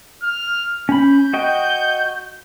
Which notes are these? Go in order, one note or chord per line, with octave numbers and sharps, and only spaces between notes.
F6
C#4 B5 G6
F#4 D#5 G5